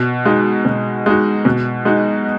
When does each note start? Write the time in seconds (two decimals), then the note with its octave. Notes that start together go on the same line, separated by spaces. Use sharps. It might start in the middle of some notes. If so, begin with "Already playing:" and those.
Already playing: B2
0.26 G#3 D#4 F#4
0.65 B2
1.06 G#3 D#4 F#4
1.45 B2
1.85 G#3 D#4 F#4